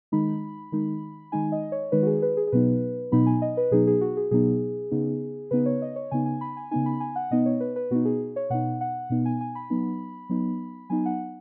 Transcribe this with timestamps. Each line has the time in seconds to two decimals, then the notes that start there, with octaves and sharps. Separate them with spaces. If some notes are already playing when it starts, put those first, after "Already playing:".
0.12 D#3 G#3 D#4 B5
0.72 D#3 G#3 D#4
1.32 D#3 G#3 D#4 G#5
1.52 D#5
1.72 C#5
1.92 D#3 G#3 D#4 B4
2.02 F#4
2.07 G#4
2.22 B4
2.37 G#4
2.47 G#4
2.52 B2 F#3 B3 D#4 B4
3.12 B2 F#3 B3 D#4 B5
3.26 G#5
3.42 D#5
3.57 B4
3.71 B2 F#3 B3 D#4 G#4
3.87 G#4
4.01 F#4
4.17 G#4
4.31 B2 F#3 B3 D#4 G#4
4.91 C#3 B3 D#4
5.51 C#3 B3 D#4 B4
5.66 C#5
5.82 D#5
5.96 C#5
6.11 C#3 B3 D#4 G#5
6.26 G#5
6.41 B5
6.57 G#5
6.71 C#3 B3 D#4 G#5
6.86 B5
7.00 G#5
7.16 F#5
7.31 B2 B3 D#4 D#5
7.46 C#5
7.60 B4
7.76 B4
7.91 B2 B3 D#4 F#4
8.05 G#4
8.36 C#5
8.50 B2 B3 D#4 F#5
8.81 F#5
9.10 B2 B3 D#4
9.25 G#5
9.41 G#5
9.55 B5
9.70 F#3 B3 D#4
10.29 F#3 B3 D#4
10.90 F#3 B3 D#4 G#5
11.05 F#5